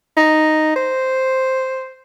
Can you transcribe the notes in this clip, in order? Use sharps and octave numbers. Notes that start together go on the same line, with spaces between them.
D#4
C5